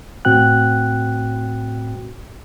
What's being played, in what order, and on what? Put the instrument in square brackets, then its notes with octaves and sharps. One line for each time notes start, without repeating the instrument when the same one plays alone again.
[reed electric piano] A2 C4 F#4 G5 F#6